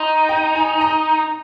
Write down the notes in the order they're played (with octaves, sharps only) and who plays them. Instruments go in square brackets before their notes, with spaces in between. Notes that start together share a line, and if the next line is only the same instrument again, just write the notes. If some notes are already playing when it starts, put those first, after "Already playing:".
Already playing: [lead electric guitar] D#4 [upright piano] C6
[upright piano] G5
G#5
A#5